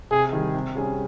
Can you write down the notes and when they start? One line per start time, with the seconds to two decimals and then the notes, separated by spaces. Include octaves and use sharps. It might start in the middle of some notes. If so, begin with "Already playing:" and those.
0.11 C3 G#4
0.33 D#3 G3
0.54 C3
0.75 G3 C#4 G#4